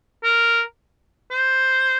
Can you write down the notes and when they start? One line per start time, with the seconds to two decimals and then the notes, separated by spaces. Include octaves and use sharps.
0.24 A#4
1.31 C5